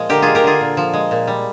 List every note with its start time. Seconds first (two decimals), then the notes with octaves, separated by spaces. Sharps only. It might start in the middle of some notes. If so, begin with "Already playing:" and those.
Already playing: A#2 F3 G#3
0.09 D3 G4 A#4
0.22 G#3 F4 G#4
0.35 G4 A#4
0.44 D3 F4 G#4
0.61 A#2
0.77 F3
0.93 G#3
1.11 A#2
1.27 G3